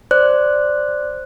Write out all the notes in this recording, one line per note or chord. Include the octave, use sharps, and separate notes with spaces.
C5 D5 F#6